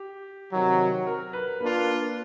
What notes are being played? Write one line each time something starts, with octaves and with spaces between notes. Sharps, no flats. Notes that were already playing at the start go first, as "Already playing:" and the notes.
Already playing: G4
C3 D#3 F#3
A#4
B4
A#3 D4 F4 B4